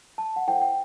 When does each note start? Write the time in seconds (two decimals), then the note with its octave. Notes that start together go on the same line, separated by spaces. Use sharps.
0.18 A5
0.36 F#5
0.47 E4 A4 C5 G5
0.55 F#5
0.62 G5